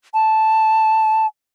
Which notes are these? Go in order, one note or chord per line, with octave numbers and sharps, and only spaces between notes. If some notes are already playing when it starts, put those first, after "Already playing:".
A5